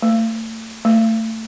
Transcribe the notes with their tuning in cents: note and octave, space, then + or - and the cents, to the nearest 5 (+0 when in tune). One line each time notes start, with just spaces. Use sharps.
A3 +30
A3 +20